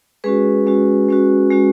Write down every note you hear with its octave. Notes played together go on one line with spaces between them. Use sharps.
G#3 C#4 F#4 G#4 B4
G#3 C#4 F#4
G#3 C#4 F#4
G#3 C#4 F#4